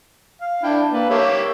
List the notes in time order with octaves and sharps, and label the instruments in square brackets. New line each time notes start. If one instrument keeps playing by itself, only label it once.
[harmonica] F5
[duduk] D4 [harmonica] E4 G5
[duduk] A#3 [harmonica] B4 A5
[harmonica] A#3 G4 E5 [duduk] C#5